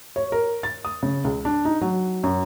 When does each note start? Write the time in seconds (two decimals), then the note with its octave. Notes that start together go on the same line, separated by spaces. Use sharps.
0.16 C#5
0.32 A#4
0.63 A6
0.85 D#6
1.03 C#3
1.24 C#2
1.45 D4
1.65 D#4
1.81 F#3
2.24 F#2